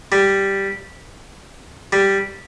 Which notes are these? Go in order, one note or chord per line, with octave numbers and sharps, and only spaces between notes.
G3
G3